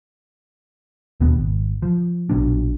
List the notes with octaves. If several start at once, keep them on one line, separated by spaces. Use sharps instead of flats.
D#2 B2 B3
G#1
F3
A#1 B2 F#3 D4